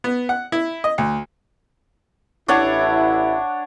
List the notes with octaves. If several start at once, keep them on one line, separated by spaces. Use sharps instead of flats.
B3
F#5
E4
D#5
D2
A1 D4 E4 C#5 F#5